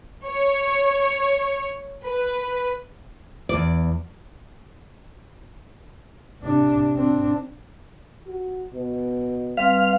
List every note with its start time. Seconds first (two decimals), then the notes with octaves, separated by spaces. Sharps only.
0.26 C#5
2.05 B4
3.49 E2 D5
6.42 C3 D4
6.96 C4 D4
8.27 F#4
8.74 B2
9.57 G3 C4 B4 F5